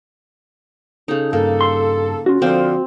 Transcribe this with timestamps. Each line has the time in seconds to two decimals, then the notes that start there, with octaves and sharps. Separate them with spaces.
1.08 C#3 D#4 A4
1.33 G2 A#3 A4
1.61 C6
2.26 C#4 F4 F#4
2.42 D3 F3 C4 C5 F5